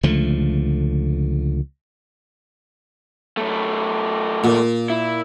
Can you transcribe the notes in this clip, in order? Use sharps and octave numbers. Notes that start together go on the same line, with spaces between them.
C#2 D3 F3 A3
F#2 A3
A#2
E4